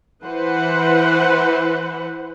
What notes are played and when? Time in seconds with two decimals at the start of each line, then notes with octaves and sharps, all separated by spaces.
0.24 E3 B4 C5 F#5